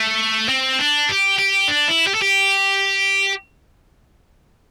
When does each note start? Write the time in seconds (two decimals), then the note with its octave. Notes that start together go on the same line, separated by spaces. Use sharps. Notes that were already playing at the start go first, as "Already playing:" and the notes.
Already playing: A3
0.49 C4
0.79 D4
1.09 G4
1.39 G4
1.68 D4
1.88 E4
2.07 G4
2.14 A4
2.21 G4